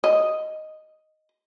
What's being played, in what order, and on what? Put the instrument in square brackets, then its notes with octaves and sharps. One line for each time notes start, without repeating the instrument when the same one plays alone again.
[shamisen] D#5